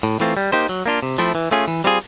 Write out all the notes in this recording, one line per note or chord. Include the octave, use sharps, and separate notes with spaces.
A2
E3 A3 C4 F4
G3
A#3 D#4 G4 C5
F#3
A#3 D4 F4
C3
F3 A3 C4 E4
E3
A3 C#4 F4 G#4
E3
G3 C4 F4 G#4